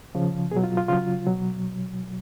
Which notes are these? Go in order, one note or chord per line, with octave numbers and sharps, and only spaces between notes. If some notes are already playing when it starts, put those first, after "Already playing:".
C#3 F3
B2 F#3 G#4
F4
F4
C#3 F#3 F4
B2 F#3